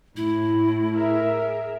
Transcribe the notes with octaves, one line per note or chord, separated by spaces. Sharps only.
A2 E4
G#4 A#4 E5